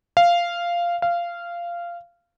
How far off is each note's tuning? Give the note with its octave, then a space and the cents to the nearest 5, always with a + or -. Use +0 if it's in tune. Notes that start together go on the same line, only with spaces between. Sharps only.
F5 -10
F5 -15